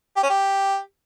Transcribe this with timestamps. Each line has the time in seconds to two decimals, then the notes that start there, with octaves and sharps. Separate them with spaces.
0.17 G4
0.23 C#4
0.30 G4